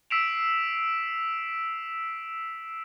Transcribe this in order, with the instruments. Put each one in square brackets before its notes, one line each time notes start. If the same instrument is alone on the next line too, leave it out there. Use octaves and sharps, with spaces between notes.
[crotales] E6 B6 C7 D7 E7 F7